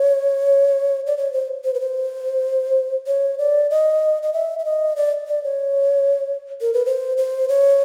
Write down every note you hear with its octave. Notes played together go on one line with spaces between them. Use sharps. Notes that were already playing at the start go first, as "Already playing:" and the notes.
Already playing: C#5
D5
C#5
C5
C5
B4
C5
C#5
D5
D#5
D#5
E5
E5
D#5
D5
D5
C#5
A#4
B4
C5
C5
C#5